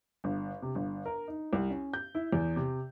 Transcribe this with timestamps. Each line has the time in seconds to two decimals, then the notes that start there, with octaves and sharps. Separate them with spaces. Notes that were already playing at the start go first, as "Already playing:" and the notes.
0.24 G1
0.62 C3
0.75 G1
1.06 A#4
1.28 D#4
1.53 C2
1.70 C#4
1.93 G6
2.15 E4
2.33 E2
2.56 C3